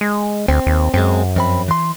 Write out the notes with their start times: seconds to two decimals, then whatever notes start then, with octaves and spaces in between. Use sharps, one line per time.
0.01 G#3
0.48 D2 C4
0.67 D#2
0.94 F#2 G#3 C4
1.36 F2 C4 B5
1.68 E3 C6